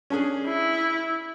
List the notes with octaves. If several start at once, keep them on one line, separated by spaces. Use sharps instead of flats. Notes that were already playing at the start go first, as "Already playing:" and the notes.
C#4 D4 G#4
E4